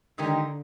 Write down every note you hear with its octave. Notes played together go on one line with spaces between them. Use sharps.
D3 D#3 G#3 D#4 G4 A#4